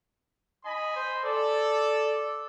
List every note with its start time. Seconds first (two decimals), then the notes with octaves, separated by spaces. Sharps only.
0.65 D#5 G#5 B5
0.96 C5
1.24 A4 D5